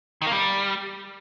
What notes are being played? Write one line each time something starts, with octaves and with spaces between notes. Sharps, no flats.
D#3
A#3
G3